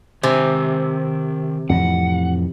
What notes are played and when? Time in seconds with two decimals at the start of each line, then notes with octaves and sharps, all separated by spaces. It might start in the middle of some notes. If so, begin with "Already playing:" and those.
0.23 C3 D#3 G#5
1.70 F2 A2 E3 F#5